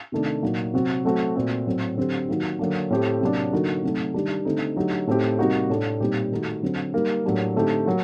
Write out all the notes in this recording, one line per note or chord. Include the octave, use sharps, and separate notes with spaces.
C3 D#3 A3 D4
A#2 F#3 A#3 D#4 F#4
C3 F#3 C4 F#4
F#3 A3 C4 F#4
A#2 A3 C4 F#4
A2 F#3 C4
D3 F#3 C4 G4
D#3 F#3 A#3 D#4 F#4
D3 F#3 A#3 D4
A2 A3 C4 G4
C3 F#3 A#3 D4
D3 F#3 A#3 D#4 F#4
C3 F#3 A3 D#4
D#3 G3 D4 G4
D3 A3 C4 D#4
D3 F#3 A3 D#4 G4
A2 A3 C4 D#4 G4
C3 G3 A#3 D#4 F#4
A2 A3 D4
A#2 G3 C4 D#4 G4
D#3 A3 D#4 F#4
D3 F#3 C4
G3 A#3 D#4
A2 F#3 A#3 D4 G4
D3 A3 C4 D#4 G4
F#3 A#3 F#4